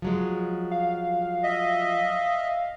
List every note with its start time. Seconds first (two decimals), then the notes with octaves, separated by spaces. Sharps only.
0.02 F3 F#3 G#3
0.71 F5
1.43 D#5 E5